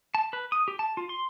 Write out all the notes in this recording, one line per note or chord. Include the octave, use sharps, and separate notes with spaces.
A5
B4
D#6
G4
A5
F4
C6